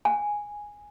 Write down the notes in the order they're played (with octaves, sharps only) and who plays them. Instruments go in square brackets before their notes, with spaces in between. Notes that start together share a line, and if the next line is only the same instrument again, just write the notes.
[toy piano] G#5